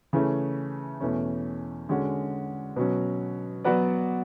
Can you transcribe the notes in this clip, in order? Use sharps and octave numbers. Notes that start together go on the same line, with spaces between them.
C#3 E3 A3 C#4
E2 B2 A3 C#4
D3 G#3 C#4 F#4
B2 F#3 C#4
F#3 B3 F#4 B4 D5